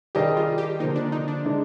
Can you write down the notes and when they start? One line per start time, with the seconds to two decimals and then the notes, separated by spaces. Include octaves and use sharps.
0.15 D#3 G3 D4 G4 G#4 D#5
0.37 F4
0.58 G4
0.79 D3 F3 A#3 D#4
0.96 D4
1.12 D#4
1.28 D4
1.45 D3 G#3 D#4